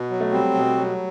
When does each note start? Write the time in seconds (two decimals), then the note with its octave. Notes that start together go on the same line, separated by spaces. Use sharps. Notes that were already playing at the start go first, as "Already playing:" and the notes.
Already playing: B2 B3
0.10 F#3
0.20 A3
0.32 G3 C4
0.54 B2
0.76 F#3